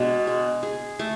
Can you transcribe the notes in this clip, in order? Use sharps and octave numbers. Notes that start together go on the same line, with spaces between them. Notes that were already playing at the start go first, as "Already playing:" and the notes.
Already playing: B2 G#3 D4
G#3
G#4
A3